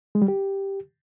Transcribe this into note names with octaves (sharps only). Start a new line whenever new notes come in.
G#3
G3
G4